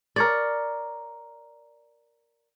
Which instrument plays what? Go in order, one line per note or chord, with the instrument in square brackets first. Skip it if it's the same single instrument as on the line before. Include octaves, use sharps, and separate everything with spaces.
[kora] A#4 C#5 D5